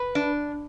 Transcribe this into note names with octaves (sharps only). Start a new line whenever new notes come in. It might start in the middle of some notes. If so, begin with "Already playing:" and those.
Already playing: B4
D4